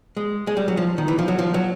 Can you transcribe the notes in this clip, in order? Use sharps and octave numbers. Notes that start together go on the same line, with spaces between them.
G#3
G#3
G3
F#3
F3
D#3
E3
F3
F#3
F3
F#3